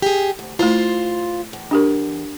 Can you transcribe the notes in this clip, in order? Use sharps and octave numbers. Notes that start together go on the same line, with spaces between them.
G4 G#4
D2
A3 E4 F4 C5
E2
D4 G4 A#4